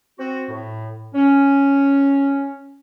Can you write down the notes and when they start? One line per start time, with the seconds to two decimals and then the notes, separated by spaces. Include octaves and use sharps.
0.19 C4 F#4
0.49 A2
1.15 C#4